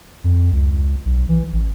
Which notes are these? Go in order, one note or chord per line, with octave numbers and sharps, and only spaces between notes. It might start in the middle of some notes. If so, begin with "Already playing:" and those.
F2
C#2
B1
E3
A1